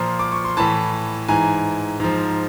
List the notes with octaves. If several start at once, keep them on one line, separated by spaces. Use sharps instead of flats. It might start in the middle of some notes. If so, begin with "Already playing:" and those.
Already playing: A#2 F3 A#5 C6
D6
C#6
C6
A2 E3 A5 B5
G#2 E3 G#5 A#5
G#2 F3